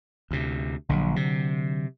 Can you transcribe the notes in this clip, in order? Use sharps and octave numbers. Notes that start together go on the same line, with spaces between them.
D2 C3
A#1 D3 F#3
C3